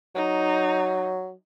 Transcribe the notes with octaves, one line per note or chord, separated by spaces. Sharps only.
F#3 D#4